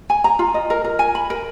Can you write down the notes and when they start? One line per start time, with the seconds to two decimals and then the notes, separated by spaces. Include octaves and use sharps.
0.10 G#5
0.24 A#5
0.39 F4
0.54 D#5
0.70 A#4
0.85 A#4
0.99 G#5
1.15 B5
1.30 A#4